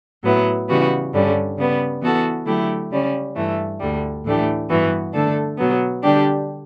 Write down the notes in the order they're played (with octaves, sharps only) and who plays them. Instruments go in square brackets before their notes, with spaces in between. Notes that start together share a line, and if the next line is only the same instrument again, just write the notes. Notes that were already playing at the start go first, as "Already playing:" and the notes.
[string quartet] A2 F#3 B3 E4
C#3 E3 G3 B3 F#4
G2 D3 G3 C#4
C#3 G3 B3
E3 B3 F#4 A4
D3 F#3 A3 E4 G4
C#3 G3 C#4
G2 E3 A3
D2 D3 G3
A2 E3 A3 D4 G4
G2 E3 B3 F#4
D3 A3 D4 A4
B2 F#3 B3
D3 G3 D4 G4